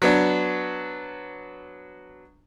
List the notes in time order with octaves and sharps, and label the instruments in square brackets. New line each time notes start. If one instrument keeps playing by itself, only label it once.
[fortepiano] F#3 B3 D4